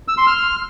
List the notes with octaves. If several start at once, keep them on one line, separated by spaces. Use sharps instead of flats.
E6
C6
F6